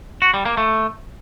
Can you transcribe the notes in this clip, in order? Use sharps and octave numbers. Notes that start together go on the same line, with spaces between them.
F#4
G3
A#3
A3